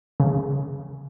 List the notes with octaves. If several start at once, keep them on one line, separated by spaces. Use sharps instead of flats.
C#3